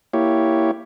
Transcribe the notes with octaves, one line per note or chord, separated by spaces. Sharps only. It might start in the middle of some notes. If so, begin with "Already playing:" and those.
A#3 E4 G4 C#5